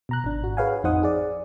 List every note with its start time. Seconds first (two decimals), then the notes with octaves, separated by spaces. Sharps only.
0.09 B2 A#5 F#6
0.24 G#1 D4
0.44 F#4
0.57 G#4 B4 C#5 F5 F#5 G#5
0.83 A1 F2 D#4 C5 F#5 D#6
1.03 G#4 D5